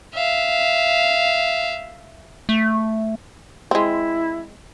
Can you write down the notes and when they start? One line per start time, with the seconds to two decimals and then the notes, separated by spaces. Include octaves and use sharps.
0.14 E5 F5
2.49 A3
3.71 G#3 C4 E4